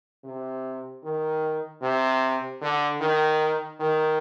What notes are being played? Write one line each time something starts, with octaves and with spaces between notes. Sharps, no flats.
C3
D#3
C3
D3
D#3
D#3